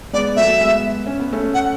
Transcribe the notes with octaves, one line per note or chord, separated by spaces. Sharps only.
G#3 B3 D5
F#3 A3 E5
G#3 B3
C#4
B3
A3 C#4
F#5